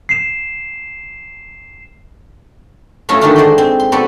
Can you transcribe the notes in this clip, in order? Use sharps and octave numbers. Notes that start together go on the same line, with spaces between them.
C7 E7
F#3 A3 C#4 F4 A4 D#5
D3 D#3 A3 D4 D#4 F#4
G#3 C5 D5 G5 C6
C4
C6
B3 C4 F#4 A4 B4 D5